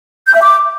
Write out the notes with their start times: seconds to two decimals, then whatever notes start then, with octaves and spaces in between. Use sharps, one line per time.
0.27 G6
0.34 E5
0.41 D6